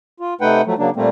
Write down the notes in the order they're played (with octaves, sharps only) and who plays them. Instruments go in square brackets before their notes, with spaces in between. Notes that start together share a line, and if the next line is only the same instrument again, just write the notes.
[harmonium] F4
C3 A3 D#4 B4 F#5 G5
F3 F#3 A3
C#3 F#3 A#3 D4
A#2 G3 A3 A#3 C4